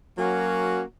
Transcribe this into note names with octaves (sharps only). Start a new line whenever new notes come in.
F#3 A#3 C#4 F#4